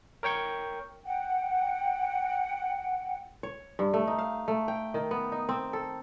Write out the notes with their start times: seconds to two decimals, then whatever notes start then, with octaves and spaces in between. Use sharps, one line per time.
0.23 A#4 C#5 G5 C#6 G6
1.05 F#5 G5
3.43 C#5
3.79 G2
3.93 A3
4.07 D#4
4.19 F5
4.48 A3
4.68 G5
4.94 D#3
5.11 B3
5.32 D#4
5.49 C4
5.73 A4